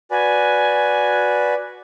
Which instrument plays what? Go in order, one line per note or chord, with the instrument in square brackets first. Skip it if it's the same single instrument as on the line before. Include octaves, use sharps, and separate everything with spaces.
[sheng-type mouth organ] F#4 B4 D5 [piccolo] G#5